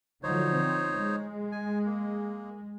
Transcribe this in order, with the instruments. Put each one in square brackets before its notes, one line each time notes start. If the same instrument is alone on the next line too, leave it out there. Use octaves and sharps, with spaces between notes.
[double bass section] D3 F3 F#3 [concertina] D#4 C5 C#5
[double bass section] C4
G#3
[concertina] G#5
A#3